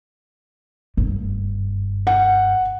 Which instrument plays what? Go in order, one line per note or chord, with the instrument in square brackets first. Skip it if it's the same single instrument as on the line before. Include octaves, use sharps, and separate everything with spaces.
[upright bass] F#1 G2
[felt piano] F#5